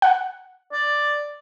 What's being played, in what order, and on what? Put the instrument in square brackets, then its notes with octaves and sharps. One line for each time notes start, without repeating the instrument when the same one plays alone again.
[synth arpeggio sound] F#5
[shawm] D5